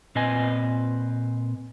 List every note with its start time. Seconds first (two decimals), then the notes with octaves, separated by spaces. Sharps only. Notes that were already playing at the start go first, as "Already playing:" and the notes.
0.15 A#2 C4 B4 D#5 G#5